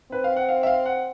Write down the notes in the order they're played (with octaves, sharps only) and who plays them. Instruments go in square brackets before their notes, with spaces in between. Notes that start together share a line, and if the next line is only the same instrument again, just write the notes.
[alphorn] C4 [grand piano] B4
[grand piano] F5
F#5
F5
E5
F5
F#5